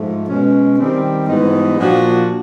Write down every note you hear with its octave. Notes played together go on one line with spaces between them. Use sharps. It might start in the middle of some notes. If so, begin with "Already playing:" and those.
Already playing: G#2 F3 A3
B2 G#3 C#4
D#3 G3 C4
G#2 E3 G3 B3 D#4
A#2 F3 A#3 D4 F#4